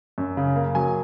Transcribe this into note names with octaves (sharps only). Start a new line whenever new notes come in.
F#2
C#3
A#3
F#3 G#5